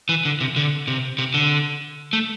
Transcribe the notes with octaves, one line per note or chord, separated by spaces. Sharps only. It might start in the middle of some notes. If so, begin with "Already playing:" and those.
E3
D3
C3
D3
C3
C3
D3
A3